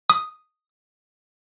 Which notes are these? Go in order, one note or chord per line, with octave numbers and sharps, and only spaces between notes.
D#6